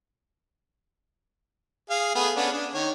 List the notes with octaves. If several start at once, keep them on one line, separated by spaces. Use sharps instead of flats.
G#4 F5
A3 B3 G#4
B3 C#4 D4
D4
D#3 C#5